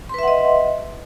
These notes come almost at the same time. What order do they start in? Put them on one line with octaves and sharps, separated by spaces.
C6 B4 E5 F#5 D#5